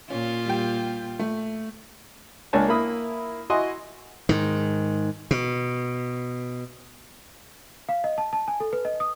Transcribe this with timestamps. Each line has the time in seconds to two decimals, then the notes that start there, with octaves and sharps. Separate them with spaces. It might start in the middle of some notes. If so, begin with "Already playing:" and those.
0.10 A#2 C#4 F4
0.45 G3 G5
1.19 A3
2.53 C#2 A#3 D4 C#5 G#5 A5
2.68 A#3 E4 B5 D#6
3.50 E4 F#4 D#5 G#5 C6 D#6
4.29 G#2 D#3
5.31 B2
7.89 F5
8.04 D#5
8.18 A5
8.33 A5
8.48 G#5
8.60 A4
8.73 B4
8.85 D#5
9.00 D#6